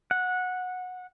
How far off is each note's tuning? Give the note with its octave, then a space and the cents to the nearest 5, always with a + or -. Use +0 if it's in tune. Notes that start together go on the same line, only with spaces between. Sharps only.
F#5 -15